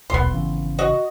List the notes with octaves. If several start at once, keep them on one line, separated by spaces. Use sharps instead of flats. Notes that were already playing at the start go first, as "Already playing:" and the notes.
D#1 B1 B3 C6
G#1 C#3 E3
F#4 D#5